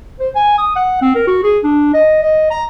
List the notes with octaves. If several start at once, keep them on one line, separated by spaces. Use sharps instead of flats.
C5
G#5
D#6
F#5
C4
A#4
F#4
G#4
D4
D#5
D#5
A#5